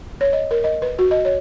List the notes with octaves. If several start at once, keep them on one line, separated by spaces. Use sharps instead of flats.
C#5
D#5
A#4
D#5
B4
F#4
D#5
C#5